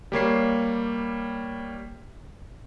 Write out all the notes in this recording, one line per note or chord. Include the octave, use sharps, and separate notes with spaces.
G3 A#3 C#5 C7